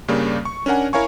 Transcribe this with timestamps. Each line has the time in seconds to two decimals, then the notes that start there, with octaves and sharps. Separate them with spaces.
0.08 G2 C#3 G3 A#3 D5
0.45 C#6
0.66 C#4 D4 A#4 F#5 G#5
0.93 E4 A#4 C#5 F5 G#5 C#6